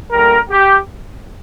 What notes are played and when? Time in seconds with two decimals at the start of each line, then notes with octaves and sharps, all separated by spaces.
0.11 D2 D3 G3 A#3 A#4
0.50 G4